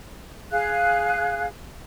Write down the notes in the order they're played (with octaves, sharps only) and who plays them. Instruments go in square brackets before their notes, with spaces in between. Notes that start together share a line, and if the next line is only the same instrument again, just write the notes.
[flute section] G#4 F5 F#6